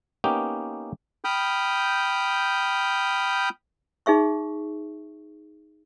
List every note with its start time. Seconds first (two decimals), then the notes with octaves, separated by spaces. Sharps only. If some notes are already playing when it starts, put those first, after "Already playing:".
0.24 A#3 B3 C#4 D#4 G4 G5
1.24 G5 B5 D#6 F6 G6
4.06 D#4 G#4 E5 C#6